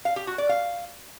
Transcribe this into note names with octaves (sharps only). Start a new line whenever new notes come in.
F5
G4
F#4
D5
F5